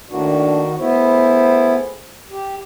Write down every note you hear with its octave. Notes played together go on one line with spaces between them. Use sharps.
A2 D#3 A#3 D4 F#4
A2 B3 E4 G#4 C5
G4